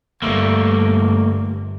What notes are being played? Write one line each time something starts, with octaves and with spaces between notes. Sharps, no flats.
G1 A3 A#3